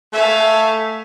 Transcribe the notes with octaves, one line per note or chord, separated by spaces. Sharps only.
A3 E5 F5 G#5